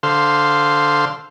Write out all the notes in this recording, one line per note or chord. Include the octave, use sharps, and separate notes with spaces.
D3 A4 C5 F5 C6